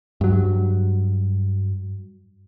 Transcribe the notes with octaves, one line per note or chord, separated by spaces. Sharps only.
G2 F#3